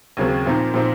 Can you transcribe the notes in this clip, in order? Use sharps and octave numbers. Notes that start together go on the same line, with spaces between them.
D#2 C#3 F#3 C4
A#2 F3 C4 D#4
A#2 F3 C4 D#4